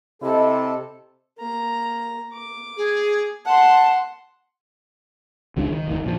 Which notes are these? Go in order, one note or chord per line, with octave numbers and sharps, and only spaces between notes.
C3 E4 A4 D#5
A#3 A#5
D6
G#4
F#5 A5 C6
C#2 F#3 G#3 D4
D#3
F1 D2 D#3
G2 A#2 F3